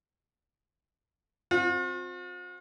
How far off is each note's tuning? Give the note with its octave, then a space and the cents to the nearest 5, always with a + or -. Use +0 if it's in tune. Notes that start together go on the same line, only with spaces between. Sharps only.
C4 +0 F4 +45